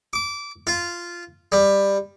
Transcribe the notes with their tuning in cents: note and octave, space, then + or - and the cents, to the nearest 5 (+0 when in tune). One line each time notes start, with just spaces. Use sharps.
D6 -20
F4 -10
G3 +15